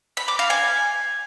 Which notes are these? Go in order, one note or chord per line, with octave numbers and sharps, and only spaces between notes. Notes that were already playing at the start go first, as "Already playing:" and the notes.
B5
D6
F5
G#5